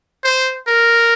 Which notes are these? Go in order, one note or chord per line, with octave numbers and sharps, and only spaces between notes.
C5
A#4